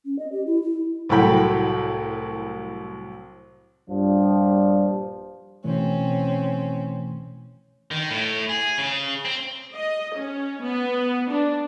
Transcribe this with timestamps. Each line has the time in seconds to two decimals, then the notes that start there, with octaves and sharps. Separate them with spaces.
0.05 C#4
0.19 D#5
0.32 G4
0.47 E4
0.62 E4
1.09 C2 A2 F#3 F#4 G5 B5
3.89 A#1 G2 F3 G3
5.64 B2 E3 A3 C4 C#4
7.91 D#3
8.10 A2
8.49 G#4
8.78 C#3
9.25 C4
9.75 D#5
10.18 C#4
10.62 B3
11.31 D4